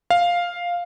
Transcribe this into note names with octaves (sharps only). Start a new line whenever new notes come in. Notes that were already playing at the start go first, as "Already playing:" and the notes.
F5